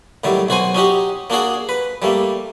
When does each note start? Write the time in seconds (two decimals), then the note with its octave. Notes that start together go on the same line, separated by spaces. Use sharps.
0.24 A2 D#3 F#3 G3
0.49 B1 F#4 C5 G#5
0.74 C#4 D#4 F#4 G4
1.30 A#3 D4 F#4 G#4
1.69 B4
2.02 G3 A3 A#3